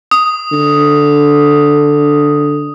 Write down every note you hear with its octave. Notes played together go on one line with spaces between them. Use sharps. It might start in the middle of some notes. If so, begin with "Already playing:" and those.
D#6
D3